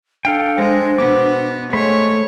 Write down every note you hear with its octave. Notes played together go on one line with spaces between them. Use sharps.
D4 A4 F5 G5
G#3 C5
B2 B3 D6
G#3 A3 C5 C#5 B5